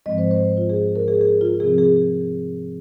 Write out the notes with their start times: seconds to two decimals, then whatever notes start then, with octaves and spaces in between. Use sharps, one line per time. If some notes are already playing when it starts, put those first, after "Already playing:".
0.06 G#2 F3 G#3 C4 D#5
0.18 C5
0.31 C5
0.57 F4
0.70 G#4
0.96 A#4
1.08 G#4
1.21 G#4
1.41 F4
1.60 C3 F3 C4 G#4
1.78 G#4